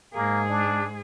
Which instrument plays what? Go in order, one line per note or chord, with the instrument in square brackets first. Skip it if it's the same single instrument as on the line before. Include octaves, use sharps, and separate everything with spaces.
[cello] G#2 G#4 [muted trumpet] A#3
[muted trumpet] D4